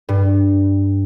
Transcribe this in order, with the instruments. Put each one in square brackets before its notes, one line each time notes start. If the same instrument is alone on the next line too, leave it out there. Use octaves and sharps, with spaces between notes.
[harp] G2